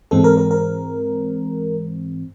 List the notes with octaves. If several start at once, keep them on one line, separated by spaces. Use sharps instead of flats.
G#2 E3 G#3 C4 A4
A#4
A#4
A#4